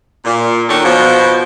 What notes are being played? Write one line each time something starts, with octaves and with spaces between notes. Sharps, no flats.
A#2
B2 D#3 D4 A4 C#5
B2 F3